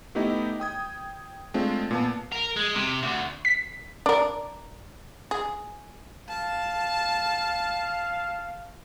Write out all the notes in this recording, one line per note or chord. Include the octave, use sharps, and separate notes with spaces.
A3 B3 D#4 E4 G4 D#5
G5 D#6 G#6
G#3 A3 C4 D4 F4
A#2 B3 A5
A#4
G#3
C3
D2
B6
D4 A#4 D5
G#4
F5 A5